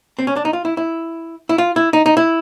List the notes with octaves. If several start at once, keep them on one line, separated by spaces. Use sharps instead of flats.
C4
C#4
D4
D#4
F4
E4
E4
E4
F4
E4
D#4
D#4
E4